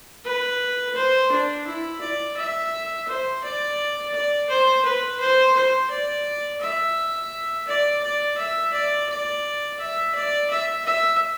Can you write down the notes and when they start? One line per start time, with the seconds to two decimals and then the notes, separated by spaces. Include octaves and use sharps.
0.25 B4
0.95 C5
1.31 D4
1.67 E4
2.01 D5
2.37 E5
3.07 C5
3.44 D5
4.14 D5
4.49 C5
4.85 B4
5.20 C5
5.56 C5
5.90 D5
6.61 E5
7.67 D5
8.03 D5
8.38 E5
8.73 D5
9.09 D5
9.79 E5
10.15 D5
10.50 E5
10.85 E5